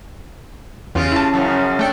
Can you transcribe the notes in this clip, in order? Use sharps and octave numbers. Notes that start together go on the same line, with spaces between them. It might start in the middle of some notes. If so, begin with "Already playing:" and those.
E2 C#3 F4 G4
E4 A5
F#2 C#3 F3
A3 D4 A4 G5